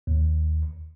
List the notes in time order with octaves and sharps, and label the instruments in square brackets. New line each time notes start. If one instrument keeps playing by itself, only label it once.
[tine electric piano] D#2